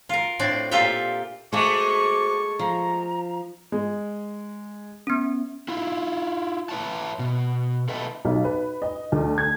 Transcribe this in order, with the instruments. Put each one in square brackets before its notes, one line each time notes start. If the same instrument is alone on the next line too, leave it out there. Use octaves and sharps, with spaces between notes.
[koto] F4 A#4
A2 C4 D4 D5
A#2 F4 G4 A4 E5 G5
[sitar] G#3 A3 [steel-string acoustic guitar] F#4 C5 [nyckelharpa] C#6 [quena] D6
[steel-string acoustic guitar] F3 [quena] A#5
[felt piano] G#3
[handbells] B3 C#4
[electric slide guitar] E4 F4
B4 C#5 E5 A5
B2
A4 B4 D#5 E5 A5
[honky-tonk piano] B1
B4
D#5
D2
G#6